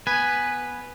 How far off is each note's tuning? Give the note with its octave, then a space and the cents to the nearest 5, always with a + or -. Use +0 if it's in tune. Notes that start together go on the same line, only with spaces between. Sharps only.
B3 +0 B4 +0 G#5 +0